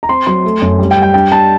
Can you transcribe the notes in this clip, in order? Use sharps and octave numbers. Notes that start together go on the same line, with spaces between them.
A#5
C4 C6
F#3 C6
A3
F#2
G3
G5
G3
G5
D4 G5
D4 A5